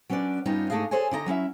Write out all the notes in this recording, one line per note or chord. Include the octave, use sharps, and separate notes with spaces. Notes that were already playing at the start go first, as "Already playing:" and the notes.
F#3 C#4 D4 B4 D5
G2 G3 B3 C#4 D#4 F4
G#2 A3 D4 G#4 D#5 F5
G#4 A4 C5 C#5 G#5
D3 E4 D#5 A#5
F#3 C#4 E4 E5